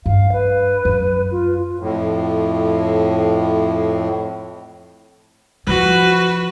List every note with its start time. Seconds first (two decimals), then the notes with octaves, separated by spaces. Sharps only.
0.06 G2 F5
0.33 B4
0.85 F#2
1.32 F4
1.79 F2 A2
5.67 F3 E4 F#4 B4